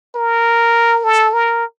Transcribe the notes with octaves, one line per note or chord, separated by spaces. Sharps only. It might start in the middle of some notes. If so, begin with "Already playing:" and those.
A#4
A4
A#4